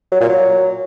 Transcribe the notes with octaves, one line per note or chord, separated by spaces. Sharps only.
F#3
A#2
F#3